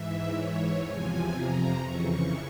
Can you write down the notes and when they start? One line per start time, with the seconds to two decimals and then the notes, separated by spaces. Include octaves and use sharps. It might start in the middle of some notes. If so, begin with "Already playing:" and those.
Already playing: G#2 E3 E5
0.31 G#2 E3 C#5
0.81 E2 C3 F3 G#5
1.31 F2 C3 F3 A#5
1.80 F2 C#3 E3 C#6